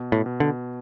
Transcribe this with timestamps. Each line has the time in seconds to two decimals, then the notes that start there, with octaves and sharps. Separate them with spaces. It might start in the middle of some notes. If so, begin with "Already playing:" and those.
Already playing: B2
0.12 A2
0.26 B2
0.40 D3